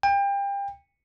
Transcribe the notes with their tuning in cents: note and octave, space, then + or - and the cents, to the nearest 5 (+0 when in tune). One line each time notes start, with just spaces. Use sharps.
G5 +30